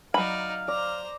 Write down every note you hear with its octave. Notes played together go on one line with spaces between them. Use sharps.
F#3 D#4 D5 F5 B5
C5 D5 A#5